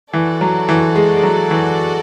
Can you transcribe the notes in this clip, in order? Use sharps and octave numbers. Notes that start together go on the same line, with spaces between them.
E3 F#4 A4 D5
F#3
E3
G#3
G#3
F#3
E3